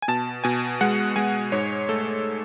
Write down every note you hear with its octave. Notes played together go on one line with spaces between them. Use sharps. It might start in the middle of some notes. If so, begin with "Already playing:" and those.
G#5
B2 A5
B2 G#5
G#3 F#5
G#3 G#5
G#2 C#5
A3 A4